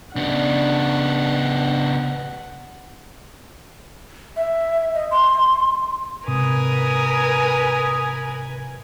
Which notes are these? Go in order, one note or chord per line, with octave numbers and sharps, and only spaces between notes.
C#3 B3 D4 F#5
E5
D#5
C6
G#2 C3 A#4 B4 G#5 D#6